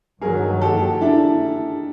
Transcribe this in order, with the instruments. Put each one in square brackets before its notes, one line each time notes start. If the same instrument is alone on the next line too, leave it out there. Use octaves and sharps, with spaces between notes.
[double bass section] G2 D#3 F#3 [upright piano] G#4 A#4
[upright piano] G4 A4
D4 E4